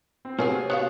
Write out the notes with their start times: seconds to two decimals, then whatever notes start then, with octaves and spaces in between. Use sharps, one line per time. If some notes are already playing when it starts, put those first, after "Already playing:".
0.25 C4
0.39 C3 F#3 A#3 B3 G#4 C#5 G#5
0.70 B3 F#4 C#5 F5 F#6